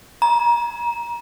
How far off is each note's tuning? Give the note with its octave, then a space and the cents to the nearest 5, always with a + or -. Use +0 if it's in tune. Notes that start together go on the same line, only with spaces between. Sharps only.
A#5 +30